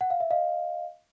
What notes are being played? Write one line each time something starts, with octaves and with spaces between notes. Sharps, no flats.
F#5
F5
E5
D#5 F5